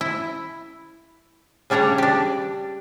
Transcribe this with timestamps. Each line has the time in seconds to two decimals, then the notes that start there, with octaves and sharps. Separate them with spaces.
0.01 E4
1.70 C#3 G3 D4 C#5 A#5
1.98 D4 G4